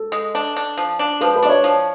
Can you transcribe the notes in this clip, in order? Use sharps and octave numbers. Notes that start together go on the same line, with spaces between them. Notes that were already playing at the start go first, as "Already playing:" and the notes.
Already playing: A4
G#3
D4
D4
F3
D4
F3 B4
B4
D4 D5
C#5
F3